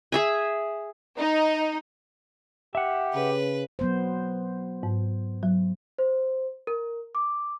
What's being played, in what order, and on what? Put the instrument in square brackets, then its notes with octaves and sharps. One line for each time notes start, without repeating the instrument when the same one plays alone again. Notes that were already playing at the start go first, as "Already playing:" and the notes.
[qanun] G#4 E5 G#5
[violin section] D#4
[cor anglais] G4 [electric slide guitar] E5 F#5
[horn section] C#3 [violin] B4
[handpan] F#3 B3 C5
[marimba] G#2
F#3
[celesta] C5
A#4
D6